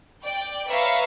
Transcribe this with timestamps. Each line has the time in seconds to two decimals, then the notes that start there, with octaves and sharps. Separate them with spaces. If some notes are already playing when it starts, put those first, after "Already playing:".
0.22 D5 G5
0.67 B4 C#5 E5 F5 A#5